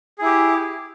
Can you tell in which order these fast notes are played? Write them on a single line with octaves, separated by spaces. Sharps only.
G#4 E4 G4